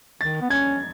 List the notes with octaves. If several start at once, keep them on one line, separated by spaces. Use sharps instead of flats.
D#3 A6
B3
C#4 G#6